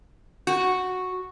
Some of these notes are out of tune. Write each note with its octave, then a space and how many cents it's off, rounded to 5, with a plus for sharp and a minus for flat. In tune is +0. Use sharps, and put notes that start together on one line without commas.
F#4 -5